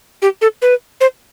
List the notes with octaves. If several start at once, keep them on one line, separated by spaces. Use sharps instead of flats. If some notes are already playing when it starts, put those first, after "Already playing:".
G4
A4
B4
C5